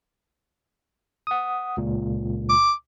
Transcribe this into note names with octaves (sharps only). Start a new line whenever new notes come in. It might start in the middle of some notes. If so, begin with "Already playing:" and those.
F#5 D#6
C#2 A#2
D6